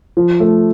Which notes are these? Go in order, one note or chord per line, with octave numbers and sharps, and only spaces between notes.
F3
A3